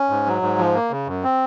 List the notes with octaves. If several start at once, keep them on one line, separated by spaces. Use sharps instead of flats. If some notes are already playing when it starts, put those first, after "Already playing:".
Already playing: C#4
G#2
F#3
G#2
F3
A#3
C#3
F#2
C4